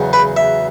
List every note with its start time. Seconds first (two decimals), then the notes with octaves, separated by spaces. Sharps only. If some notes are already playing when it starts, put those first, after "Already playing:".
Already playing: E2 C#3 F#3
0.13 B4
0.37 E5